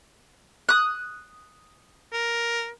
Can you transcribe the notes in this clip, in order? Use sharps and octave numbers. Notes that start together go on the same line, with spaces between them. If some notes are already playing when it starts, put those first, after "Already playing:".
D#6 F#6
A#4